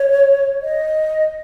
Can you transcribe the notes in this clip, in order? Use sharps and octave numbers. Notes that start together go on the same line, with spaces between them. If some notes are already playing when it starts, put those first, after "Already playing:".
Already playing: C#5
D#5